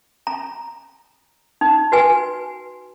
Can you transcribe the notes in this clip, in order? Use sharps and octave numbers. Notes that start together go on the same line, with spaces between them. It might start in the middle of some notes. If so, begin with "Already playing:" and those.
A#5
D#4
F#4 B4 G#5